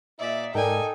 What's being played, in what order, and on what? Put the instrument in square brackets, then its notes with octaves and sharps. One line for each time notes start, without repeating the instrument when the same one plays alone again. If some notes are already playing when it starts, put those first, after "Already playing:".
[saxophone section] A#2 D#4 E5 [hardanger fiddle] D5
[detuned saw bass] G#2 [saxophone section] D#4 A4 [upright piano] A#4 D5 [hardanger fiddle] G5 G#5